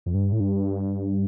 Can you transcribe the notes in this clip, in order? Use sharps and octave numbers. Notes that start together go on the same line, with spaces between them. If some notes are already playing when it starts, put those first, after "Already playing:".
F2
G2
A2
G2